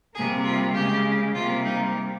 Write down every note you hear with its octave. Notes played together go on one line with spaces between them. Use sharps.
C3 G3 A#3 G#4
F4
C#3 G#3 G4
C3 G3 A#3 F4
D#4